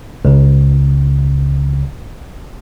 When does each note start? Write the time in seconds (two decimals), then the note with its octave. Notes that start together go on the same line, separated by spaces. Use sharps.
0.25 C#2 C#3